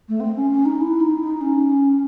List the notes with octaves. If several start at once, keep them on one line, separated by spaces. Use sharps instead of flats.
A3
C4
C#4
C#4
D#4
E4
D#4
D#4
C#4